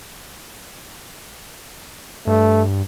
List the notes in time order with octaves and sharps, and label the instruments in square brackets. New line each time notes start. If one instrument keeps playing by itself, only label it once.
[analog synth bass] G2 [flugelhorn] A3